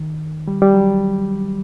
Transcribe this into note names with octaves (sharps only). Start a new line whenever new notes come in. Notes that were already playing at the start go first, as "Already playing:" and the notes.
Already playing: D#3
G3
G3
F#3